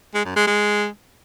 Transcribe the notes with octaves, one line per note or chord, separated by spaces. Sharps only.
G#3
F#2
G#3
G#3